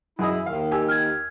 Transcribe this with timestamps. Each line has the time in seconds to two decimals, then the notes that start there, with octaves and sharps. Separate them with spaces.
0.19 F#2 E4 G#4 D#5
0.46 D#2 D#3 F5
0.72 G4 G#5 E6
0.88 F6 G#6